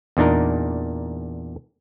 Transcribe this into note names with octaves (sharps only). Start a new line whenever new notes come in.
E2 A#2 D4 D#4 A#4